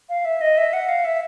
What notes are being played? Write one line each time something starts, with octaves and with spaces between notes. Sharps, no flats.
F5
E5
D#5
E5
F#5
F5
E5